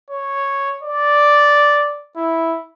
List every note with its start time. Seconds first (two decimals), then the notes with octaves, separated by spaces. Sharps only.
0.10 C#5
0.83 D5
2.17 E4